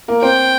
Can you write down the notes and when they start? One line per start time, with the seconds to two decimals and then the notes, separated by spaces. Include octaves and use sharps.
0.08 A#3 A#4
0.22 C4 C5 G5